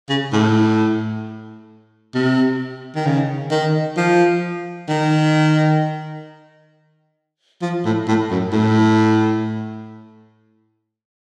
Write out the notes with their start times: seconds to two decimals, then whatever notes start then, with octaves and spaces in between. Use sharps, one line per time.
0.09 C#3
0.33 A2
2.14 C3
2.95 D#3
3.06 C#3
3.51 D#3
3.97 F3
4.89 D#3
7.62 F3
7.85 A2
8.08 A2
8.31 F#2
8.53 A2